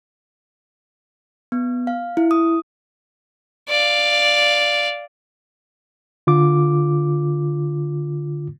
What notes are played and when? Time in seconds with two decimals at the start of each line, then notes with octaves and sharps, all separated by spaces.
1.52 B3
1.87 F5
2.17 E4
2.31 D#6
3.69 D5 F5
6.27 D3 F4 D6